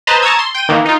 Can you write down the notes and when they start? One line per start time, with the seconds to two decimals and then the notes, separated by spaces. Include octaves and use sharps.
0.07 B4 C5 D#5 A5 A#5
0.22 A5 A#5 C#6 D#6 E6 G#6
0.39 C6
0.54 G5 D#7
0.69 D#3 E3 A#3
0.86 D#4 F4